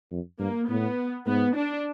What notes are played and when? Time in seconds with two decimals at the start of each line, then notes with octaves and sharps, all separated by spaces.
0.11 F2
0.39 G2 A#3
0.69 A2 B3
1.26 G#2 B3
1.56 D4